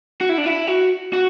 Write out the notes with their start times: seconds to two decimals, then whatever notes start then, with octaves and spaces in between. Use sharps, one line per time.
0.21 F#4
0.29 E4
0.38 D4
0.46 E4
0.67 F#4
1.13 F#4